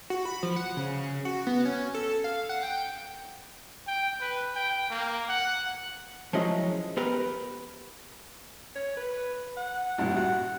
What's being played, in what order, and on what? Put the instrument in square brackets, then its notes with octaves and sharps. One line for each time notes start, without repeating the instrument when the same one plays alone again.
[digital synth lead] F#4
B5
F3
F#5
C#3
F#4
B3
C#4
A4
F5
F#5
G5
[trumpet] G5
B4
G5
A#3
F#5
[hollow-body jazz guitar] F3 F#3 G#3 C#4 E4 D#5
B3 G4 A#4 B4
[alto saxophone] C#5
B4
F#5
[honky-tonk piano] A1 G2 A#2
[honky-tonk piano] F#4 [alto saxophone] F#5